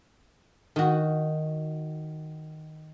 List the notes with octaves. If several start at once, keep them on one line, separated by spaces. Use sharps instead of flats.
D#3 F#4